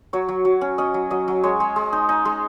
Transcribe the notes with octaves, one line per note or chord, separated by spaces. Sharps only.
F#3 C#5
F#3
F#3
C#4
C#4 D#5
F#3
F#3 D#5
F#3
G#3 C#5
G#3
G#3
D#4
D#4
G#3